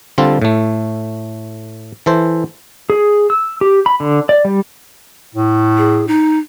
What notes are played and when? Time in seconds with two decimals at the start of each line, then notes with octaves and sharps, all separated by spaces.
0.18 D3 G3 C4 F4 A4
0.42 A2 A3
2.06 E3 A4 C5
2.90 G#4
3.30 E6
3.61 G4
3.86 B5
4.00 D3
4.29 D5
4.45 G3
5.35 A2
5.78 G#4
6.08 D#4